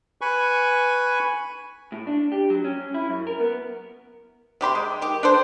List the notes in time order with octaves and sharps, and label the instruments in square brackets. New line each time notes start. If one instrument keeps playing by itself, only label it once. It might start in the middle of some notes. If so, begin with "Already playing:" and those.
[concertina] B4 G#5 B5 C#6
[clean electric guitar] A2
D4
G4
F#3
C#4
E4
F#2
A#4
B3
[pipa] C3 G4 B5 C6
G#3
D#3 G4
D4 A4 C5